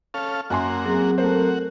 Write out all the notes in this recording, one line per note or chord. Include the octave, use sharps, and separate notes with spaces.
C#4 A4 F5
F#2 A#3 F#4 G#5 C6
F#3 C4 G#4
A3 F#4 A#4 C5